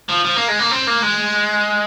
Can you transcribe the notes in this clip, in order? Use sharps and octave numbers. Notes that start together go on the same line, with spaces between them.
F3
F3
A#3
G#3
A#3
C4
A#3
G#3